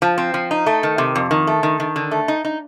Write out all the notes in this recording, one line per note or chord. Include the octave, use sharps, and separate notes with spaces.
F3
C4
F3
D#4
A3
D#3
C3
F2
D#3
A3
D#3
D#3
D3
A3
D#4
D#4